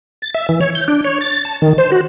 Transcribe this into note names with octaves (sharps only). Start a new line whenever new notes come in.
A6
E5
E3
C#5
G6
D4
C#5
A6
A5
D#3
C5
F#4